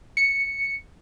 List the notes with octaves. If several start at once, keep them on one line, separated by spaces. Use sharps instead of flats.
C#7